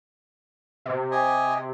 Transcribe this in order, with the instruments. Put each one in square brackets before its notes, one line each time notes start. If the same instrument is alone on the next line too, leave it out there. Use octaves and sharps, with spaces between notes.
[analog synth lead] C3
[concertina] G4 D#5 G#5